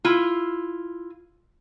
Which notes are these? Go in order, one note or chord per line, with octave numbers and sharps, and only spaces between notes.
E4 F4